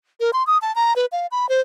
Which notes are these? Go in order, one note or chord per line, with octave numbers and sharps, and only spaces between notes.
A#4
C6
D#6
A5
A#5
B4
F5
B5
C5